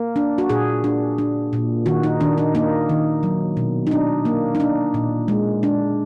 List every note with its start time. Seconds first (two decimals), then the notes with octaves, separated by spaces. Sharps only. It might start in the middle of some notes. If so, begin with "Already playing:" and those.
Already playing: A#3
0.16 D4
0.38 F#4
0.50 A#2 G#4
0.84 D4
1.18 D4
1.53 A#2
1.86 D#3 F#4
2.03 D#4
2.20 D#3 D4
2.38 D#4
2.55 A#3 D#4
2.89 D#3
3.23 F#3
3.57 B2
3.87 D#4
3.91 D4
4.25 A#3
4.55 D#4
4.60 D4
4.94 A#2
5.28 G#3
5.63 D4